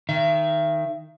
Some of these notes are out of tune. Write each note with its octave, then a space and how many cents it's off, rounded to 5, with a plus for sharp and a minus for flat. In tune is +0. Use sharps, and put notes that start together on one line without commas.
D#3 +0 E5 +35